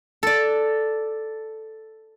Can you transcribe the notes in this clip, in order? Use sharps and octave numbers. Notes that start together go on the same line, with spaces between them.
A4 D5